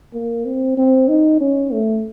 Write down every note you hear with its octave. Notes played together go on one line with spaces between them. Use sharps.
A#3
C4
C4
D#4
C#4
A3